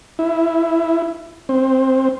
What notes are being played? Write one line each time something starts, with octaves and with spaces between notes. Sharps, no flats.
E4
C4